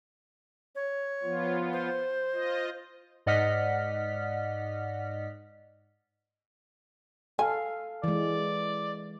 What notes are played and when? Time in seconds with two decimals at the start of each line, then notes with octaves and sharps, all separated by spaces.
0.75 C#5
1.23 F3 B3 F4
1.73 C5
2.33 F4 D#5
3.26 G#2 D5 D#5 F#5 F6 B6
7.39 A4 F5 G#5
8.04 E3 G#3 D5